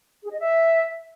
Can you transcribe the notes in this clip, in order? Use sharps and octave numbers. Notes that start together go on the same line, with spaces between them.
G#4
D#5
E5